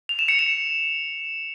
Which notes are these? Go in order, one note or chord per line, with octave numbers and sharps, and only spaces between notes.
F7
E7
C#7
E7